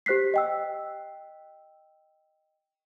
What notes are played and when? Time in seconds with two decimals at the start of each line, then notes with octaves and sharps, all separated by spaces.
0.06 G4 C5 F#6 B6 C7
0.34 D#5 G5 E6